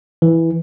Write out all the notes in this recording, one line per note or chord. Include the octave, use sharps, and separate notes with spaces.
E3